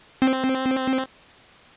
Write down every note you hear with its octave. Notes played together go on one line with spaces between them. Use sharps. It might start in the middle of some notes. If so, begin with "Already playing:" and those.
C4